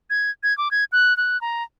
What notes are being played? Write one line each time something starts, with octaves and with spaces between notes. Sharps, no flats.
G#6
G#6
D6
G#6
F#6
F#6
A#5